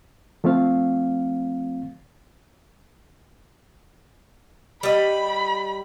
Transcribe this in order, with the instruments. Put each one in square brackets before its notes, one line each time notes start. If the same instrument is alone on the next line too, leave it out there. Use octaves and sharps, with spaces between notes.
[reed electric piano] F3 A3 C4 F4 F5
[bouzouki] G3 D#5 [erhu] B5